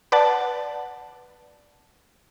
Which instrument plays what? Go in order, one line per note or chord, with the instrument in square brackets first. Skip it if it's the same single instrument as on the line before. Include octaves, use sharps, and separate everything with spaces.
[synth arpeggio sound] B4 D5 F#5 A5